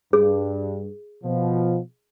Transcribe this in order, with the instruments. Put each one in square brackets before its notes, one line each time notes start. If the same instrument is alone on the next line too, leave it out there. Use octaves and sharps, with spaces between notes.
[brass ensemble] G2 [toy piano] G#4
[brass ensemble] B2 F3